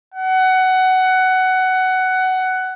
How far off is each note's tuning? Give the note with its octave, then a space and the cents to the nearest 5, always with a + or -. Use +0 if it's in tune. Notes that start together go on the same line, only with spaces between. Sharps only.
F#5 +15